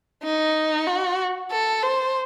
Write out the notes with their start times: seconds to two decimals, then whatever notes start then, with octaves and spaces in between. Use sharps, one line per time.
0.24 D#4
0.87 F#4
1.51 A4
1.83 C5